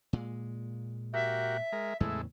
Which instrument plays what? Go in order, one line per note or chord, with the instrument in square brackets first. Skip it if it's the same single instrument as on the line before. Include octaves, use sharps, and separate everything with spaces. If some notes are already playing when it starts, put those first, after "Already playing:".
[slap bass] A#2 G#3
[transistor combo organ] F#4 G4 A#4 [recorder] E5
[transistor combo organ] G#3 A#4
[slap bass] E2 A2 C#3 [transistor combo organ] G#3 A3 E4